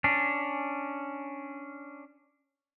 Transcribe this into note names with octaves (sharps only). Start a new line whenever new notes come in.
C#4 D4